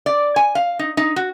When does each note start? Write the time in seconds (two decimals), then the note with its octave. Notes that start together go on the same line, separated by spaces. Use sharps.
0.06 D5
0.36 G#5
0.55 F5
0.79 D#4
0.97 D#4
1.16 F#4